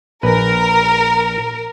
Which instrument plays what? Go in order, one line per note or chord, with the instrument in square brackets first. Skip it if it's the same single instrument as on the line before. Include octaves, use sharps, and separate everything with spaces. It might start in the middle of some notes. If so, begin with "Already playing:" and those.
[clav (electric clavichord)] A#1 B4 [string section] A#4